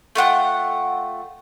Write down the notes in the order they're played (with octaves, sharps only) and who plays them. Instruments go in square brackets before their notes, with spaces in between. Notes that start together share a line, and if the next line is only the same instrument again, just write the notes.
[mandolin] A3 F4 F#5 G5